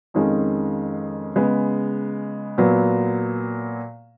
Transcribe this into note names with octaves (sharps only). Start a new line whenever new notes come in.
F2 D#3 G#3 C#4
C#3 G#3 B3
A#2 F#3 B3